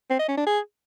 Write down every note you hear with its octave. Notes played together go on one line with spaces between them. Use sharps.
C4
D#5
C#4
D4
G#4